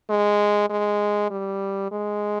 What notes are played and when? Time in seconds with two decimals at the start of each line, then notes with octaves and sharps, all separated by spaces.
0.09 G#3
0.70 G#3
1.31 G3
1.92 G#3